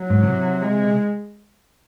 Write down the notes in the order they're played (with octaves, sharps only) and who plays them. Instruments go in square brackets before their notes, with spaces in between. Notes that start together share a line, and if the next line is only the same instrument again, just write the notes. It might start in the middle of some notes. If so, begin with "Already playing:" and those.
Already playing: [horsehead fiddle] F#3
[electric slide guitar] G#2
C#3
C3
[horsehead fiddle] G#3